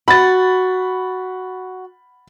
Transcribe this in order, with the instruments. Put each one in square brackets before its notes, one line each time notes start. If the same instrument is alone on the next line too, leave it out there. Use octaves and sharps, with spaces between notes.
[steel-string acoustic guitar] F#4 [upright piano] B5 A6